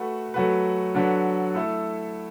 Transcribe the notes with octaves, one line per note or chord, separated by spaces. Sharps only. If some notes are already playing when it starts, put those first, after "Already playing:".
Already playing: A3 F#4 B4
F#3 A3 F#4 B4
D3 F#3 D4 B4
A3 E4 A4